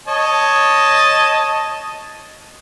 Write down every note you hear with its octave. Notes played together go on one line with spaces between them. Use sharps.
C#5 D#5 A5